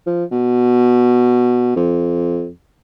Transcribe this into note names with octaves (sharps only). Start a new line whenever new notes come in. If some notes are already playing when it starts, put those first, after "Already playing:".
F3
B2
F2